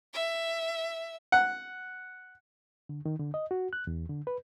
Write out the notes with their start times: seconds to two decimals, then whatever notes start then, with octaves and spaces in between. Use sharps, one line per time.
0.14 E5
1.32 F#5
2.89 D3
3.06 D#3
3.20 D3
3.34 D#5
3.51 F#4
3.73 F#6
3.87 E2
4.10 D3
4.27 B4